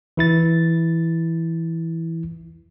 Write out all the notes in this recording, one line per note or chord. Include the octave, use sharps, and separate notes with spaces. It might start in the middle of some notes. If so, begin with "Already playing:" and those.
E3 E4 A6